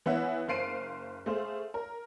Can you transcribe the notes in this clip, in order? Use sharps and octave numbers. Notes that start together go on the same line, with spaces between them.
E3 B3 E4 C#5 E5 F#5
F#1 C5 F5 C7 D7 D#7
A3 G#4 C5 F5
A#4